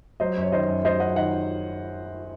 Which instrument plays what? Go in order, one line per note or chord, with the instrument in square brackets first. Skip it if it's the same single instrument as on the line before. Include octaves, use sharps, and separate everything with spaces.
[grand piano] F#3 C5 D#5
F#2
C#5
D#3 C5 D#5
F#2
F#3 C5 D#5
F#2 D#5 F#5
D#3 D#5 F#5